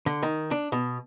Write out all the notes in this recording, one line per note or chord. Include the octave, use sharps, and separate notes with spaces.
D3
D#3
D4
B2